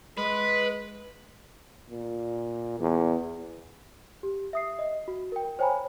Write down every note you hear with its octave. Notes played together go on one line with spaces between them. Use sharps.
G#3 B4
A#2
E2
G4
E5 D#6 C7
D#5
F#4
A#4 G5
C5 C#5 G5 G#5 A#5 B5